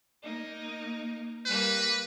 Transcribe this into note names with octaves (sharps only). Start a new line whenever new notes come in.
A#3 D#4
G3 A#3 B4